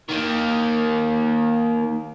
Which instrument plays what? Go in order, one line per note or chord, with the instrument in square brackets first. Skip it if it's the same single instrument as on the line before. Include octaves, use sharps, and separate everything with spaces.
[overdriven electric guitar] D#3 A#3